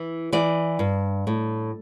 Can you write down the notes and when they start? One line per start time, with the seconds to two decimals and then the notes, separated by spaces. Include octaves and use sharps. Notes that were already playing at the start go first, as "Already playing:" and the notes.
Already playing: E3
0.33 E3 D5
0.79 G2
1.27 A2